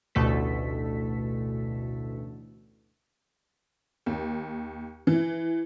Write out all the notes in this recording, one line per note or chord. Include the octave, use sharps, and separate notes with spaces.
A1 D2 B2 A3 A4 B6
D#2
E3